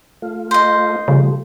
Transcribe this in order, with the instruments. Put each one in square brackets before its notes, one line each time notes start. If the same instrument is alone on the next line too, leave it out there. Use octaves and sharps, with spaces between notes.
[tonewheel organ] A3 F4
[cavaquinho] C5 D#5
[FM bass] C#3 [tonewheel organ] F3 G3 A3